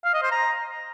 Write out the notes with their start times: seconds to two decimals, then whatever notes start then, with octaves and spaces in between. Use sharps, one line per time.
0.05 F5
0.14 D#5
0.23 C5
0.32 A#5